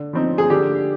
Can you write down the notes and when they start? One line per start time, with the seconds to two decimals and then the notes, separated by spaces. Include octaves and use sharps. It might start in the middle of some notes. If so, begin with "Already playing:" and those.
Already playing: D3
0.13 F3 C4 D#4
0.38 G#4
0.50 D3 G4